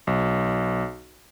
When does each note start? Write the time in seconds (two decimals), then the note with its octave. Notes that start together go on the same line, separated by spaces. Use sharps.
0.07 B1